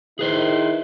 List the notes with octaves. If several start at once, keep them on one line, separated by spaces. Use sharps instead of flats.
D#3 E4 G#4 B4 C5